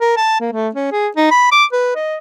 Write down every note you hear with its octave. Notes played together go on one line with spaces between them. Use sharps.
A#4
A5
A#3
A3
C#4
G#4
D#4
B5
D6
B4
D#5